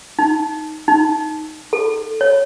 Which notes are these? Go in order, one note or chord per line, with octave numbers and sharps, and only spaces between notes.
D#4
D#4
A4
C#5